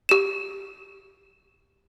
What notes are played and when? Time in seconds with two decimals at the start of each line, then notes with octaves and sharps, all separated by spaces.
0.09 G4 E7